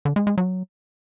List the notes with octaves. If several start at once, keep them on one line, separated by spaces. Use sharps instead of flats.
D3
G#3
G#3
F#3